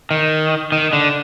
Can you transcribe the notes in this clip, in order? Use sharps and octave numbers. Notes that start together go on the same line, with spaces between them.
D#3
D#3
D3